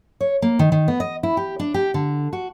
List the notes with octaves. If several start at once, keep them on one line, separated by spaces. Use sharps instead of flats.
C#5
A#3
D#3
D#3
B3
D#5
E4
G4
D4
G4
D3
F#4